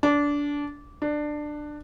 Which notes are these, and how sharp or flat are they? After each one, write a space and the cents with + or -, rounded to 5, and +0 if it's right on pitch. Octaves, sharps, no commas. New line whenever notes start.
D4 -20
D4 +15